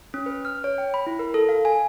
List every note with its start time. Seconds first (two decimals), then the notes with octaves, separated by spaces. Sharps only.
0.14 C#4
0.26 B4
0.45 F6
0.64 C#5
0.78 G5
0.94 B5
1.07 E4
1.19 A#4
1.34 A4
1.49 F5
1.65 G#5